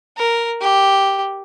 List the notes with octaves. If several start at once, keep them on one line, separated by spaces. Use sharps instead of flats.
A#4
G4